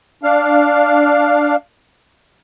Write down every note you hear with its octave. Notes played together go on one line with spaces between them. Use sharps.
D4 F5